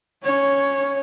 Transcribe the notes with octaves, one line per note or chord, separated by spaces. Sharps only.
C#4 C#5